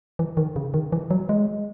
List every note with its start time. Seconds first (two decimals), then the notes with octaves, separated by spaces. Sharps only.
0.19 E3
0.37 D#3
0.56 C#3
0.74 D#3
0.92 E3
1.11 F#3
1.29 G#3